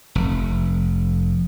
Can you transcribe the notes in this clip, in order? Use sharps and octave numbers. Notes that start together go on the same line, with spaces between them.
F1